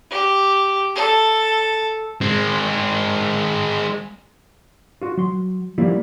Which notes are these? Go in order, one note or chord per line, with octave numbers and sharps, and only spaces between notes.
G4
A4
G#3 C4
F4 F#4
F#3 C6
F3 G3 A#3 E4